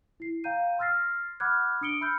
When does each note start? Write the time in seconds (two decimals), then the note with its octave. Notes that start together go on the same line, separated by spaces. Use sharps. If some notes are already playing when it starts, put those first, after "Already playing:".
0.20 E4 C7
0.44 F5 G5 A#5 G6 D#7
0.79 C6 E6 F6 A6 A#6 C7
1.40 F#5 B5 D6 F6 F#6 G#6
1.81 D4 D#6 C#7 D7 G7
2.01 E5 B5 E6 F6 G6 C#7